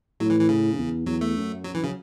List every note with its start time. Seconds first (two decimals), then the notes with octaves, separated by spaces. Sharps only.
0.20 A2 F#3
0.30 E3
0.40 E3
0.49 C#3
0.72 F#2
0.78 E2
1.06 E2 F#3
1.21 A3
1.36 F#2
1.64 F#3
1.75 E3
1.84 C#3 F#3